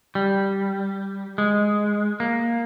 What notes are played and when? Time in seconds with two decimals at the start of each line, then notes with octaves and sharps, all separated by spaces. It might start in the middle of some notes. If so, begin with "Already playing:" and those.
0.15 G3
1.38 G#3
2.20 A#3